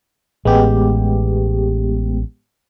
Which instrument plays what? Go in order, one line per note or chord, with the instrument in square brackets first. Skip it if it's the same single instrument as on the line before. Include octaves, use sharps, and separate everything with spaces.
[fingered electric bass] A1 [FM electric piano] G#3 B3 G4